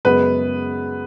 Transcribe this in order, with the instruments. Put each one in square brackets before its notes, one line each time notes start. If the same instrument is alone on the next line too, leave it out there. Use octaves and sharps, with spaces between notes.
[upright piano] F#2 C#3 G#3 B3 B4